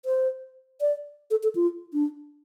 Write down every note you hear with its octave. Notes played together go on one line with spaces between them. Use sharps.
C5
D5
A4
A4
F4
D4